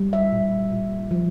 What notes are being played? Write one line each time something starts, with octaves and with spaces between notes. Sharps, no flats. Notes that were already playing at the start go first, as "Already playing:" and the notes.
Already playing: G3
E5
A#2
A#2
F3